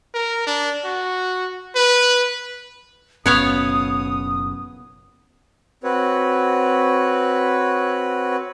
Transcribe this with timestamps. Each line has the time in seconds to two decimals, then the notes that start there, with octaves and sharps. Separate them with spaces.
0.15 A#4
0.47 D4
0.85 F#4
1.75 B4
3.26 F#1 B2 B3 C#4 C#5 F5 D#6
5.83 C4 F#4 B4 C#5